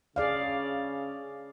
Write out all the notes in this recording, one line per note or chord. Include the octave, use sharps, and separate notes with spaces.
C#3 G#4 D5 F5